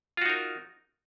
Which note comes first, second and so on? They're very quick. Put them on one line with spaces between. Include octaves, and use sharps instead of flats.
F4 F#4 D#4 A#4